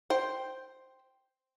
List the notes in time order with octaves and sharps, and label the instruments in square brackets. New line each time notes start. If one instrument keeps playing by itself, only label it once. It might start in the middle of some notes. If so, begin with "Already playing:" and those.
[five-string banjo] C5 G5